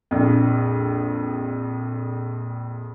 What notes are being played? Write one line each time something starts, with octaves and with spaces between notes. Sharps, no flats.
A#1 F2